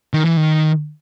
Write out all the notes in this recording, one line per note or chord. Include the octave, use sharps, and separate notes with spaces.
D#3
E3
D#3